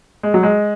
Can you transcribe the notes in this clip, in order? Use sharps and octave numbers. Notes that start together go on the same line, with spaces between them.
G#3
F#3
G#3